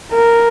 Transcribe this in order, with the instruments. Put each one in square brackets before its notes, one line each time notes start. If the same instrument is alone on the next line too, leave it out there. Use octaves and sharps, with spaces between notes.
[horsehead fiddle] A#4